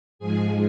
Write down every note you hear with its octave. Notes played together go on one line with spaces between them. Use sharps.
G#2 F3 G#3 G#4 G#5